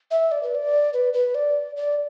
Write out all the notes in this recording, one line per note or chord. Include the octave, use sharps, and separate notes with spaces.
E5
D5
B4
D5
B4
B4
D5
D5